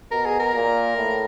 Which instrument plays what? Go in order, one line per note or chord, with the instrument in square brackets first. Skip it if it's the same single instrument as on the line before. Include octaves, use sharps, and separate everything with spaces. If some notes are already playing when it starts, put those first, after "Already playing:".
[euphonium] B2 [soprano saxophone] A#4
[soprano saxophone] G#4
A#4
[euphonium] A#2
A2